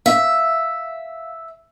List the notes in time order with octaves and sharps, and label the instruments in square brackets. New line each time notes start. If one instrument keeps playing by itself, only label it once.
[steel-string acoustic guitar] E5 [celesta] F5